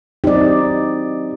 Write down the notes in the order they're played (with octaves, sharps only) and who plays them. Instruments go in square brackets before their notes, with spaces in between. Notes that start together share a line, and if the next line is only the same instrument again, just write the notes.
[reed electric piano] F#3 C4 G4 [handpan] D#4 D5